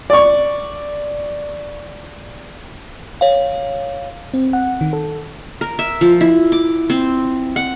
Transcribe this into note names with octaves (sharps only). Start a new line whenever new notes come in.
D5 C#6
C#5 F5
C4
F#5
D#3
A4
A#4
E5
F3
E4
D6
C4
F#5